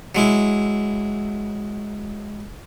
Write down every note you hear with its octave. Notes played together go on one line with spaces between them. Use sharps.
F#3 G#3 E4